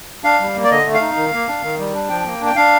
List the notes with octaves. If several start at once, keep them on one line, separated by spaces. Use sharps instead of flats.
D4 F5
G3
A#3
D5
D3 D#5
A3
F5
D#4
D#3
A#3
D4
D#3
G3
D4
F3 G5
A#3
D4
G5
D4 F5